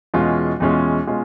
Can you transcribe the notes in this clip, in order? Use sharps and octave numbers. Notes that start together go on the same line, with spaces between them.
E2 B2 G#3 C#4 F4
E2 B2 G#3 C#4 F4
B2 G#3 C#4 F4